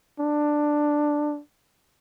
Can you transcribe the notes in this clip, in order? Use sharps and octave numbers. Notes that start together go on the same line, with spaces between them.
D4